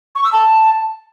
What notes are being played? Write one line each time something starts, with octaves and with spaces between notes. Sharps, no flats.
C#6
E6
A5